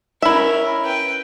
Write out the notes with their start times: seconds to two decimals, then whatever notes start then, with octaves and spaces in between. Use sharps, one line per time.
0.22 C#4 E4 A#4 E5
0.85 B4 G5